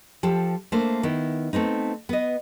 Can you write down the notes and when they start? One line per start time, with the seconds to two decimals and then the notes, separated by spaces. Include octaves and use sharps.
0.23 F3 G4 A4
0.72 A3 A#3 D4 C5
1.03 D#3 B3 E4
1.53 A3 B3 C4 D#4
2.09 B3 D#5